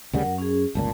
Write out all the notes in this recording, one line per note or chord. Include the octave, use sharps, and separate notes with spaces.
D2 C#3 G3 A#4 F#5
F#2
C#4 G#4
G1 C#2 A#2 A5